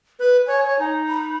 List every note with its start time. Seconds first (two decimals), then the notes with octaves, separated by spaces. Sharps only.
0.19 B4
0.47 C#5 G#5
0.66 C#5
0.79 D#4
1.08 B5